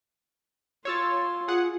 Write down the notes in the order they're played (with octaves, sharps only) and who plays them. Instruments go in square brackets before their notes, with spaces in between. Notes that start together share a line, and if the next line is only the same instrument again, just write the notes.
[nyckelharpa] F4 C6 [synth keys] C#5 E6 A6
[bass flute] F4 [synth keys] G#4 F#5